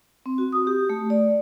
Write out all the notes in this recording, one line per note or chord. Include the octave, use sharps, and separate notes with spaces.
C4
F#4
D#6
G4
A3
D5